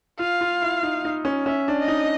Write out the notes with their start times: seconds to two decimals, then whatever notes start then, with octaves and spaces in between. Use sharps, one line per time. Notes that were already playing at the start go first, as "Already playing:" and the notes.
0.19 F4 F5
0.41 F4
0.62 E4
0.83 D#4
1.05 D#4
1.25 C#4
1.46 C#4 E5
1.68 D4
1.79 D#5
1.88 D#4